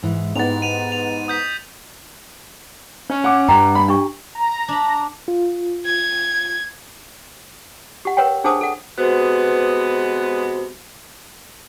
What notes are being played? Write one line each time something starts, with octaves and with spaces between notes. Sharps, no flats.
G#2 E3 G#3
G#2 B3 G4 A6 F7
D#7 F7
F7
D#6 G6 B6
C#4 C#5
F#5 D6
G2 G5 A#5
B5
D4 G4 C#6
A#5
D4 B5
F4
G#6
G4 F#5
A#4 B4 C#5 F#5 G5
D4 G#4 C5 F#5 A5 D#6
A4 F#5
C3 G#3 B3 F#4 C5